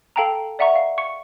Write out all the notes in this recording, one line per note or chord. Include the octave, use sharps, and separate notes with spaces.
A4 F5 G5 A5 A#5
D5 E5 F#5 A#5 C#6
F5
C#6 C#7